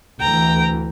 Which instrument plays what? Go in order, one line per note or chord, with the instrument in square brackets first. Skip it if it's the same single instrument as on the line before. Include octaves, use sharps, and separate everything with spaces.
[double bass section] D2 E3 [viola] G5 A#5